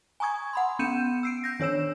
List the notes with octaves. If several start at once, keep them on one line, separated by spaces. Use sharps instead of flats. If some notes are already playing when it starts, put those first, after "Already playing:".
G#5 A#5 C#6 D#6 G#6
F#5 B5 C6
B3 C#4 G6 C#7 D#7 E7
E6 C7 D7
G6 A#6
D#3 D4 C#5 E6 E7